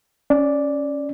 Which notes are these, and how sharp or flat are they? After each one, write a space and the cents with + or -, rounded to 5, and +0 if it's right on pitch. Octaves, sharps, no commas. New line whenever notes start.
C#4 +0 D5 +0